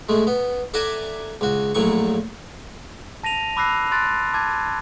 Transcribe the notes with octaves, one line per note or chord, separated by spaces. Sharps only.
G#3 A3
B3
A4 D5 E5 F#5 G#5 A#5
C#2 F#4
A#1 A2 F#3 C#6
A5 A#6 D#7 F7
B5 D6 E6 F#6 A#6 C7
C6 F#6 A6 D7
A5 D6 G#6 A6